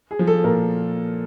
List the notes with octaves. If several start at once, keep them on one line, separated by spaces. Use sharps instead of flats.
G#4
F3
A4
A#2 A#4